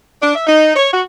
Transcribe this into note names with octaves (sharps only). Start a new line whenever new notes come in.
D4
E5
D#4
C#5
F#4